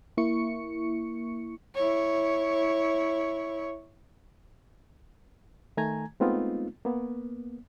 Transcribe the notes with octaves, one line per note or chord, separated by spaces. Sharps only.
A#3 E4 C#6 C#7
E4 C#5
D#3 A3 G#5 A#5 G#6
G#3 A3 B3 C4 D#4 F4
A#3 B3